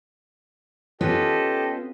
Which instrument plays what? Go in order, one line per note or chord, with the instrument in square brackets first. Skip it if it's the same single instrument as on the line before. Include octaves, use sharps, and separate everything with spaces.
[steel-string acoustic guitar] B3 C#4 F4 [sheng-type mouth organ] G4 A4 D#5